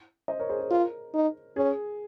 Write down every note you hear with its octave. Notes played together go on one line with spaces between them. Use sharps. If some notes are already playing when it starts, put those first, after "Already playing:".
C5 D#5
A#4 C#5
G#4 C5
G#4
F4 A#4
D#4
C#4 G#4